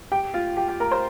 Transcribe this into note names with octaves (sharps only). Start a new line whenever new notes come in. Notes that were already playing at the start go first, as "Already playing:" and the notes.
G4 G5
F4 F5
G4 G5
G4 G5
A#4 A#5
C5 C6